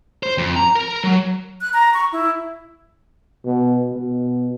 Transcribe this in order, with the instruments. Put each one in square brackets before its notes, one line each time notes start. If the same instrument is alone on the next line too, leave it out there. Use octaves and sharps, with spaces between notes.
[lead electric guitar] C5
F2
A#5
A#4
F#3
[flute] F#6
A#5
C#6
E4
[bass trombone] B2
B2